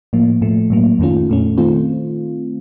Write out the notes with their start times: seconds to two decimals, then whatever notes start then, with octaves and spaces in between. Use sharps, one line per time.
0.13 A2 F3 A#3
0.41 A2 F3 A3
0.70 A2 F#3 A#3
0.99 F2 D#3 A3 C#4 F4
1.29 A#2 A3 C#4
1.58 D#3 A3 C4 F4